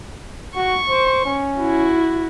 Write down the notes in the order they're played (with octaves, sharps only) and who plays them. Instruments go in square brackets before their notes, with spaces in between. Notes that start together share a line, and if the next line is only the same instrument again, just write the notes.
[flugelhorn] F#4 [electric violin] C#6
[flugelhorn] C5
C#4
[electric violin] E4 F#4